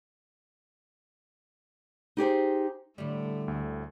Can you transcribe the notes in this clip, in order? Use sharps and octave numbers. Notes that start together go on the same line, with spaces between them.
D#4 G4 G#4 C5
A2 D3 G3 A3
D2